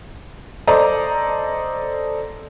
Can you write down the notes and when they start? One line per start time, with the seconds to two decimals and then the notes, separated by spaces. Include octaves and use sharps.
0.67 A4 C5 D5 D#5 A#5